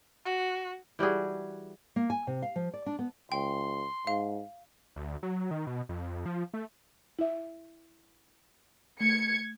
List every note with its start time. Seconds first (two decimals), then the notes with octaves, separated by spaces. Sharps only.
0.25 F#4
0.99 E3 G3 F#4 G#4
1.96 A#3
2.10 G#5
2.27 C3
2.43 F5
2.56 F3
2.74 D5
2.86 D4
2.99 B3
3.32 C#2 G5 C6
4.07 G#2 F5
4.96 D2
5.23 F#3
5.51 D#3
5.67 B2
5.89 F2
6.26 F3
6.54 A3
7.19 E4 E5
9.00 A3 G#6 C#7